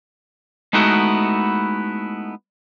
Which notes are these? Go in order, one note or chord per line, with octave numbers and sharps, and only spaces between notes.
G#3 A3 B3 D#4 E4 F#4